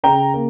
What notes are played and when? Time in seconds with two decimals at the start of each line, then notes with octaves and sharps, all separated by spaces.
0.03 C#3 G5 A#5
0.34 A#3